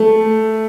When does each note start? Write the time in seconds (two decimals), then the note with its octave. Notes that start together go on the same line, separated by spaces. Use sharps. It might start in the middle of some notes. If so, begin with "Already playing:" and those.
Already playing: A3